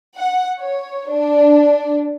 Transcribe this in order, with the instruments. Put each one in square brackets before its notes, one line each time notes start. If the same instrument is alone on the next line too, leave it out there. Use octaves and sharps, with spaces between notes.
[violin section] F#5
C#5
D4